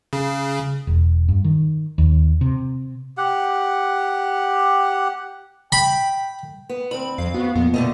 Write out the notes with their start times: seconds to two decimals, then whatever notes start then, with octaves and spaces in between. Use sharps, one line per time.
0.13 C#3
0.87 E1
1.28 G2
1.44 D#3
1.98 D#2
2.41 C3
3.18 G4 F#5
5.72 G5 B5
6.69 B3
6.91 D2 C4 B5
7.18 F2 F5
7.34 B3 F#4
7.55 F2 A#2 B3
7.74 B2 D3 A3 D#5